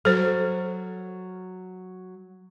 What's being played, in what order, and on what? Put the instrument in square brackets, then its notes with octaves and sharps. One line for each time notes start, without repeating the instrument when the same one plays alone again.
[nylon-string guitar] F#3 [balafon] A4 C5